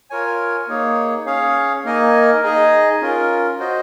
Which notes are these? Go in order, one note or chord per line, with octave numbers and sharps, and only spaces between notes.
F4 A#4 C#5 G#5
A#3 D#4 G#4 C#5
C#4 G#4 C#5 F5
A#3 D#4 A#4 D#5 G#5
D#4 G#4 D#5 G#5
C#4 F4 A#4
F#4 C5 D#5